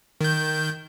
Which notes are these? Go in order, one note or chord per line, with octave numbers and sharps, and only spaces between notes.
D#3 G6